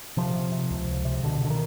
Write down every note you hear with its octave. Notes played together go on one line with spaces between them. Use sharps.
C3 F3
C3
C3
C#2
C#2
C3
B2 D3
B2 D3
D#3